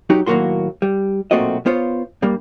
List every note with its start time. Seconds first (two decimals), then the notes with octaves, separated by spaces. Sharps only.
0.10 F#3 D#4 F#4 G4
0.26 D#2 A2 F#3 A#3 F#4 C6
0.82 G3
1.31 B1 A#2 A3 C4 F#4 D#5
1.66 B3 F4 C5 C#5
2.22 G2 G3 A#3